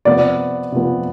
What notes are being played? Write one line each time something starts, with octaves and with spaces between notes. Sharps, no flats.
C3 F3 B3 D5
C3 F3 B3